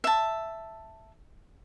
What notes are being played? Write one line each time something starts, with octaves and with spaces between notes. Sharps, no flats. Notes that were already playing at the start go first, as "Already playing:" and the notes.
E5 A5